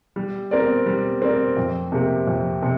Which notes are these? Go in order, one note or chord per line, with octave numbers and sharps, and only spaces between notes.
G3
C4 A#4 D5
G3
C4 A#4 D5
F2
C3 A#3 G4
F2
C3